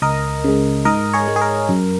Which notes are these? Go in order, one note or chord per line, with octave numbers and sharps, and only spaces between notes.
C#2 A#4 D#5
C#3 G#3
G#2 A#4 D#5
G#4 C#5
G#3
G#4
A#4
F#2